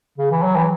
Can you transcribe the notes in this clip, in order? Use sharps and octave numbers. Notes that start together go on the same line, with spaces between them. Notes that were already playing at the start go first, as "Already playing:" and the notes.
C#3
E3
F#3
E3